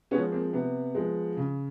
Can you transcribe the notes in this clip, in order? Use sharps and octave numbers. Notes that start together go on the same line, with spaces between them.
F3 G#3 B3 C#4
A#3 C4
C3 B3
F3 G#3
C#3